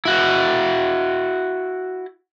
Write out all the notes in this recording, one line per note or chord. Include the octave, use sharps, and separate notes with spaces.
E4 F#4